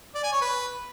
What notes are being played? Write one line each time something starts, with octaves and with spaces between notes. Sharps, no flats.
D5
G#5
C#5
B4